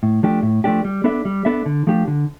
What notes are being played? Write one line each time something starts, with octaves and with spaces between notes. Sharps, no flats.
A2
F3 A3 D4 G4
A2
F3 A3 D4 G4
G3
B3 D4 A4 E5
G3
B3 D4 A4 E5
D3
F3 A3 D4 G4
D3